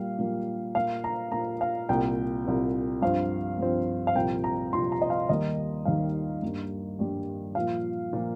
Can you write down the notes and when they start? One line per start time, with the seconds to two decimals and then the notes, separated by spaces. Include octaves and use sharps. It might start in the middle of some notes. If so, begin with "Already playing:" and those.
Already playing: A#2 G3 A#3 F5
0.19 A#2 G3 A#3
0.75 A#2 A#3 F5
1.04 A#5
1.32 A#2 A#3 A#5
1.61 F5
1.89 C2 A#2 A#3 G5
2.45 C2 A#2 A#3
3.02 G2 F3 C4 F5
3.58 G2 F3 C4
4.07 F5
4.15 C2 A#2 F3 G5
4.44 A#5
4.73 C2 A#2 F3 C6
4.92 A#5
5.02 D#5
5.10 F5
5.29 D#2 D#3 G3 A#3 D#5
5.85 D#2 D#3 G3 A#3 F5
6.42 G2 G3 A#3
6.99 G2 G3 A#3
7.55 A#2 F3 A#3 F5
8.13 A#2 F3 A#3